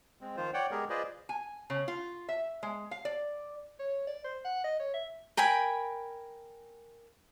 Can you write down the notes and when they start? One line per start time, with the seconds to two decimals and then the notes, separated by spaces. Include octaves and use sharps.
0.21 G#3 C4
0.37 D#3 F3 F4 C5
0.54 C#5 D5 F#5 G5
0.71 G#3 B3 G4 G#4 A#4
0.90 F4 G#4 B4 C5 D5 D#5
1.29 G#5
1.70 C#3
1.88 F4
2.29 E5
2.63 G#3
2.91 F5
3.05 D5
3.79 C#5
4.07 D5
4.24 C5
4.45 F#5
4.64 D#5
4.80 C#5
4.94 E5
5.37 A#4 G5 G#5 B5